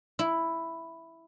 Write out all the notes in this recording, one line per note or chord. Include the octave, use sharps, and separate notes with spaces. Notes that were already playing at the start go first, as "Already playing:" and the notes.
E4